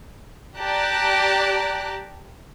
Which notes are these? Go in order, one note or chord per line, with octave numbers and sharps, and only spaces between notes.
G4 D5 A5 A#5 F#6